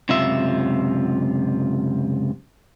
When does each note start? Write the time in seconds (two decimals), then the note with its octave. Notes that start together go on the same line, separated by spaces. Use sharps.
0.09 C#2 F#2 C3 F4 E5